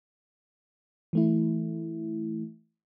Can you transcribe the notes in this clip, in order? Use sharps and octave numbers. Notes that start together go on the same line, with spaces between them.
E3 A3 E4